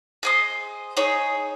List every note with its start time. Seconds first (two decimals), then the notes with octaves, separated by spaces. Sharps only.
0.23 G#4 C5 D#5
0.97 D#4 G#4 C#5